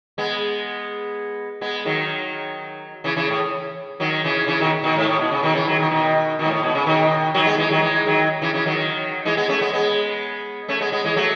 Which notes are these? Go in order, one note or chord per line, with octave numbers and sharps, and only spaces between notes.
G#3 B3
G#3 B3
D#3 F#3
C#3 E3
C#3 E3
A2
D#3 F#3
C#3 E3
C#3 E3
B2 D#3
B2 D#3
G#2
A2
B2
C#3
B2 D#3
C#3 E3
D#3 F#3
B2 D#3
B2 D#3
B2 D#3
G#2
A2
B2
C#3
B2 D#3
D#3 F#3
G#3 B3
E3 G#3
D#3 F#3
E3 G#3
D#3 F#3
C#3 E3
C#3 E3
D#3 F#3
E3 G#3
G#3 B3
A3 C#4
G#3 B3
G#3 B3
A3 C#4
G#3 B3
G#3 B3
E3 G#3
F#3 A3